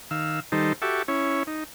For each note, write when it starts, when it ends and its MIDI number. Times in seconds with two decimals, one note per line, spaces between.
0.11 0.40 51
0.11 0.40 77
0.11 0.40 88
0.52 0.73 51
0.52 0.73 55
0.52 0.73 63
0.52 0.73 69
0.52 0.73 72
0.82 1.03 66
0.82 1.03 67
0.82 1.03 69
0.82 1.03 76
0.82 1.03 85
0.82 1.03 86
1.08 1.43 61
1.08 1.43 64
1.08 1.43 73
1.47 1.64 63